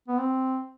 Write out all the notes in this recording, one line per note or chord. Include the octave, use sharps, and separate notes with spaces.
B3
C4